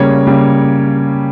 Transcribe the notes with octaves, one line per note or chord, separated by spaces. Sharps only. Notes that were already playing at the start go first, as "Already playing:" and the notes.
Already playing: C#3 G3 A#3 C#5
C#3 G3 A#3